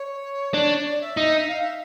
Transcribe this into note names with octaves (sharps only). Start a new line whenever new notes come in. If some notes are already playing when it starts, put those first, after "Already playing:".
Already playing: C#5
D4
D5
E5
D#4
F5
E5